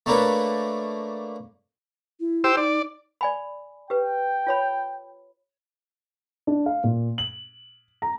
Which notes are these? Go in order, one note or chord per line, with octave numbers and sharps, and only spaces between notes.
A3 A#3 D4 A#4 B4 C#5
E4
G4 C5 E6
D#4 D5
D5 G#5 B5
G4 B4 G5
F4 C#5 B5
D4
F5
A#2
F#7
A#5